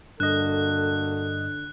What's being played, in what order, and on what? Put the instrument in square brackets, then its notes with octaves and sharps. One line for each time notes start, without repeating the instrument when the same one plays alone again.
[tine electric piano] G2 D#5 [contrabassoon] D3 [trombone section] A#3 F#4 A4 [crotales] F#6